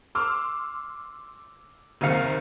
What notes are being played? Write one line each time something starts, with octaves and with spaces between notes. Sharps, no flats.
C6 D6 E6 F6
F#1 D#2 C3 D#3 F5 C#7